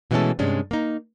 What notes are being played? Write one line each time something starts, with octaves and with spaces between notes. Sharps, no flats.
B2 E3 G#3 A3 C#4 A4
G2 C3 G#3 C#4 D4
A#3 D#4